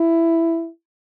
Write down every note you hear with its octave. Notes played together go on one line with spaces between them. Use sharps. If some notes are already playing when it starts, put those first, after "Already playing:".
Already playing: E4